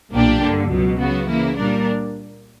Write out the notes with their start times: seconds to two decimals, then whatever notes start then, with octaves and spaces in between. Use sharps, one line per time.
0.14 B1 A#2 A#3 D4 G4
0.42 G2 D3 A#3
0.70 C#2 B2 F#3
1.00 C#3 F#3 B3 F#4
1.28 C#3 E3 A#3 E4
1.57 A#2 G3 A#3 D4 A#4